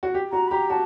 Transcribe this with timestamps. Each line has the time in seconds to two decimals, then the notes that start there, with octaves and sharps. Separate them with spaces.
0.03 F#4
0.14 G4
0.32 F#4 A#5
0.47 B5
0.51 G4 A#5
0.70 F#4 A5